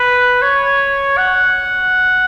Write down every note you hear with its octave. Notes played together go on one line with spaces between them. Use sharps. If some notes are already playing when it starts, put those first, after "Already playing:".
Already playing: B4
C#5
F#5